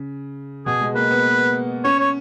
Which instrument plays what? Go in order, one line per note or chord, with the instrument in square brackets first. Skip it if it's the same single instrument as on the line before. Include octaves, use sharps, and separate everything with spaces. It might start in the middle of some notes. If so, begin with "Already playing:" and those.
Already playing: [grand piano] C#3
[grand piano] B2 [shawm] G#4
[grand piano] G#3
[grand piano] A#3 [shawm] B4
[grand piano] B3
[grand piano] C#4 [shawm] C#5
[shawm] C#5